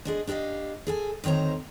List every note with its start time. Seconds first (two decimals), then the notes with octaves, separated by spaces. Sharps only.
0.05 G#3 D4 G#4
0.27 D4 G4 A4 D#5 F5
0.87 G#4 A4 G#5
1.24 D2 D#3 C4 C#5 A#5